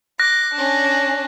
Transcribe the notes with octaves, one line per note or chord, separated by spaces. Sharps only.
D6 F#6 A#6
C#4 D4